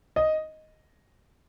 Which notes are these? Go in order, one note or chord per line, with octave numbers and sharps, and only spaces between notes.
D#5